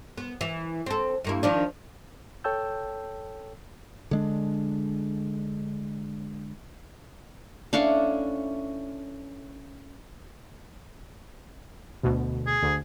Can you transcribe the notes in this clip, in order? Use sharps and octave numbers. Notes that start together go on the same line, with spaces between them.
B3
E3
C4 A4
G2 A#3 E4
D#3 F3 D4
A4 C#5 G5 A5 E6 G6
D3 G#3 D4
A3 C#4 D4 E4 F5 C#6
D2 B2
G#4
D2